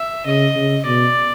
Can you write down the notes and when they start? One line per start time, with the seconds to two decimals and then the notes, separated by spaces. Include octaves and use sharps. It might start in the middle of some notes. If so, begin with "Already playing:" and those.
Already playing: E5
0.26 C#3 D#5
0.55 C#3
0.86 B2 D5